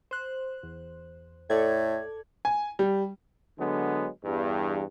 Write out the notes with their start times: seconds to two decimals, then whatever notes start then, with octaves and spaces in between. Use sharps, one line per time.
0.11 C5 F#6
0.63 E2
1.50 A2 A4 D5 G#6
2.45 G#5
2.79 G3
3.58 D3 F#3 G#3 B3
4.24 E2 G2